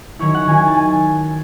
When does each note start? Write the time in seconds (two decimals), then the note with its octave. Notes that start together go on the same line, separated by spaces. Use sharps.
0.19 D#3 F#3 C#4 E4 C#5
0.34 F#5
0.47 D#3 F#3 C#4 E4 G#5
0.57 G#5
0.68 A5
0.76 G#5